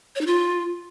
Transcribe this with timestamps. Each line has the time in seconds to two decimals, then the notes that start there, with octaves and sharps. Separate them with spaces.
0.16 C#5
0.21 D#4
0.26 F4